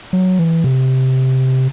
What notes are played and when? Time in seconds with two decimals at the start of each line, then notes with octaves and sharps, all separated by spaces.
0.13 F#3
0.39 E3
0.64 C3